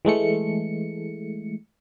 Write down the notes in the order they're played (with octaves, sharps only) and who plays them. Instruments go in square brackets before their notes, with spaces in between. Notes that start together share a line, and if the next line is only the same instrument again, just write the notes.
[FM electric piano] E3 G#3 A3 C#7